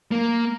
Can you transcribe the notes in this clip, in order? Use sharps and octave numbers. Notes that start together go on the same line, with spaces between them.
A#3